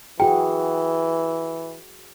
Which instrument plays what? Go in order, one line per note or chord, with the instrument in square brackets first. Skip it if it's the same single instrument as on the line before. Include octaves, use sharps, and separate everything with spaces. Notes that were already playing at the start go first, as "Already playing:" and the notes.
[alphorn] E3 [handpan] F#4 G#4 [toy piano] G5